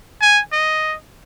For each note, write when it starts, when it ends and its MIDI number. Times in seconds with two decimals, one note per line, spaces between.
0.21 0.40 80
0.52 0.95 75